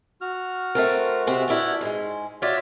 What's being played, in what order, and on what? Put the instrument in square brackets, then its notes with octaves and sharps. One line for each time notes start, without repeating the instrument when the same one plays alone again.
[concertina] F#4 F6
[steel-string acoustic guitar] A3 C4 A#4
C3 G#3 C4
B3 D4 E4
G#2 G#3
[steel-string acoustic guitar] F4 D5 [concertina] F#4 C#5 E5